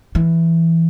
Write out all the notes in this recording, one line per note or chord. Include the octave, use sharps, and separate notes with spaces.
E3